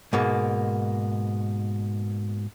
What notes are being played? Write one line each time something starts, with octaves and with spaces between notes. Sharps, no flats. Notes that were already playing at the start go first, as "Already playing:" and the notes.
G#2 B2 A#3